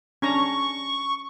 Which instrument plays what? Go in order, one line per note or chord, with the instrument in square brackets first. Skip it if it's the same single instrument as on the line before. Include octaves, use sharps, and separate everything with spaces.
[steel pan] C#4 D4 A#5 [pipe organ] C#6